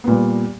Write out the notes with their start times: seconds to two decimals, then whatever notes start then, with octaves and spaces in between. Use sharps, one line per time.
0.04 B3
0.07 A#2
0.11 G3